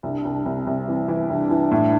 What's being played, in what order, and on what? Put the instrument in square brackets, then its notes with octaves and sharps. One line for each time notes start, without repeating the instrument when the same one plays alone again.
[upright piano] C2 [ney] D4
[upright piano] C2
[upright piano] C2 [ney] C4
[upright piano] C2
[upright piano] E3 [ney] C4
[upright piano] E3
[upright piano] C2 [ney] D4
[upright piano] E3
A2